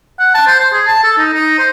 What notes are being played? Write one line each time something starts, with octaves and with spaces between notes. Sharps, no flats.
F#5
A5
C5
C5
G#4
A5
A4
D#4
D#4
C5